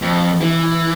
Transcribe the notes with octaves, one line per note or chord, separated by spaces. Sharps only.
F2
E3